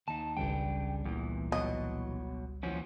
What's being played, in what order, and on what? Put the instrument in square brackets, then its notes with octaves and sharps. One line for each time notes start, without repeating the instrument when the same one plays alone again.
[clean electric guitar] D#2 D#4 [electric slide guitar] A5
[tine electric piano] G#1 C#2 G3 [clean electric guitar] C#3 D4 [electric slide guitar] G5
[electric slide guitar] E2 [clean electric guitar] A#2 E3
[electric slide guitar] B2 F#3 [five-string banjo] D#5
[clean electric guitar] D#2 E3 F#4 [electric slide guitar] F3 C#4